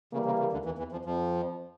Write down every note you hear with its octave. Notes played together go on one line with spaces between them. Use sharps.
C#3 E3 G3 A#3
C#3
C#3
D2 D3
E2 E3
E2 E3
F2 F3
F2 F3